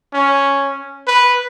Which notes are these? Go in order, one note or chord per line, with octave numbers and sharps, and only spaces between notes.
C#4
B4